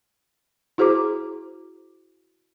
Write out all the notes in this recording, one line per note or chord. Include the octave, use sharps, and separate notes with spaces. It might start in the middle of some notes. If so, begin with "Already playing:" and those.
E4 F#4 G#4 C5 A#5 D6